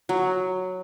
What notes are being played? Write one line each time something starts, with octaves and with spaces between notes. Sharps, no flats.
F#3